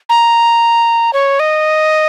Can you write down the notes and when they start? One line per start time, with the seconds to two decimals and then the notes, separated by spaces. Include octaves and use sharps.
0.09 A#5
1.13 C#5
1.40 D#5